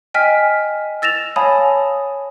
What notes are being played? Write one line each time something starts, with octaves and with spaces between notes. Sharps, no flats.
D#5 G5 G#5 F6 B6
E6 A6 A#6 E7 F7
C#5 F5 G#5 A5 B5 D#6